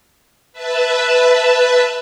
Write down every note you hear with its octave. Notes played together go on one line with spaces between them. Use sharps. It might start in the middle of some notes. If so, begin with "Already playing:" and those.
B4 E5 A5